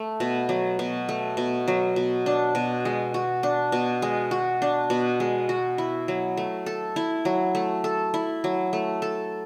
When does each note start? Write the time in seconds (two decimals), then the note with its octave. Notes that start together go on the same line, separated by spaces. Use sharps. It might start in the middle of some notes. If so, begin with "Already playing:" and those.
Already playing: A3
0.20 B2
0.49 F#3
0.79 B2
1.09 A3
1.37 B2
1.68 F#3
1.96 B2
2.26 D4
2.55 B2
2.85 G#3
3.14 F#4
3.43 D4
3.72 B2
4.02 G#3
4.31 F#4
4.62 D4
4.90 B2
5.20 G#3
5.49 F#4
5.78 E4
6.08 F#3
6.37 A3
6.66 A4
6.96 E4
7.25 F#3
7.55 A3
7.84 A4
8.14 E4
8.44 F#3
8.73 A3
9.02 A4